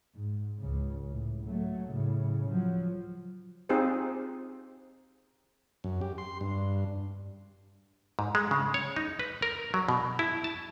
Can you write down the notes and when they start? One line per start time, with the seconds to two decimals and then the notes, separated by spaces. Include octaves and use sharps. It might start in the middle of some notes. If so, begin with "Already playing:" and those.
0.15 G#2
0.59 C#2 C#3
1.11 A2
1.45 F#3 A3
1.91 A2 C#3
2.49 F3 F#3
3.69 C4 D#4 F4 G4 G#4 C5
5.84 F#2
6.01 G4
6.18 C6
6.41 G2
8.19 G#2
8.35 G#3
8.51 C#3
8.74 C#5
8.96 D#4
9.19 B4
9.42 A#4
9.74 F#3
9.88 B2
10.19 E4
10.44 A5